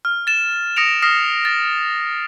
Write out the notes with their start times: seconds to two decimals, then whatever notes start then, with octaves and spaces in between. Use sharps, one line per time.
0.05 F6
0.27 A6 E7
0.76 D#6 A#6 C#7 D7 F7
1.02 D#6 F6 A#6 C7
1.45 A6